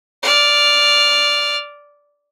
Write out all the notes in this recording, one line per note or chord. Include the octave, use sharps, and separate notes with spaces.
D5 F6